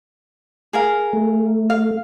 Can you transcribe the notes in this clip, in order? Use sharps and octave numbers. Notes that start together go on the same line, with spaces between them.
G#4 A#4 F5
A3
F5